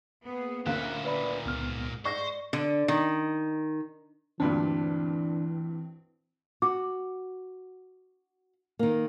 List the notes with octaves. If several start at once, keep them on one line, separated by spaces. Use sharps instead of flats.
A#3 B3 G#4
D2 A#2 A#3 C#4 E4 E5 F#6
B4 D5 B5
C#2 G#2 B3 F6
C5 D5 C#6 A#6
D3
D#3
D2 G2 A#2 E3 C4 D4
F#4 D6
D#3 A#3